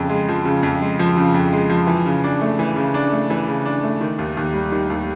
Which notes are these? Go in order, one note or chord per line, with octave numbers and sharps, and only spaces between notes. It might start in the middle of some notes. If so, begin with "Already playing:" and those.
Already playing: F2 C#3
G#3
F3
C#3
F2
G#3
F3
C#3
F2
G#3
F3
E3
C#3
D4
A3
E3
C#3
D4
A3
E3
C#3
D4
A3
D#3
D#2
D#2
G3
D#3
D#2